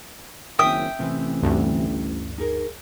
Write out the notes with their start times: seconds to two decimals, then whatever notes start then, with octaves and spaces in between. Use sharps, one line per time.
0.59 F#1 D#3 C4 C#4 E5 G5 D#6
0.99 A1 C3 E3 C4
1.43 D2 G2
2.38 D#4 G#4 A#4